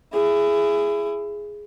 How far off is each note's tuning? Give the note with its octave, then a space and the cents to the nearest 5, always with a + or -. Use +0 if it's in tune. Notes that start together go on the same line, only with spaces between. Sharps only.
E4 +20 G#4 +0